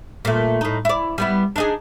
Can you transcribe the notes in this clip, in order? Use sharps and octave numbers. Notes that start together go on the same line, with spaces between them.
A#2 A3
A2 D#4
E4 D5
G3 B3 E4
D4 D#4 G#4